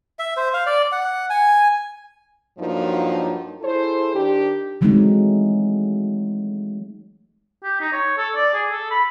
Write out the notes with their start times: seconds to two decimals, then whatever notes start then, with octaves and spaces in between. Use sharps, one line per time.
0.19 E5
0.37 C5
0.53 F5
0.66 D5
0.92 F#5
1.30 G#5
2.58 G2 F3 F#3 A#3 D#4
3.62 E4 G#4 A4 C5
4.14 D#3 D4 G4
4.81 E3 F#3 G#3 A3 C4 D#4
7.64 G4
7.81 D#4
7.93 C#5
8.18 A4
8.36 D5
8.54 G#4
8.71 A4
8.91 B5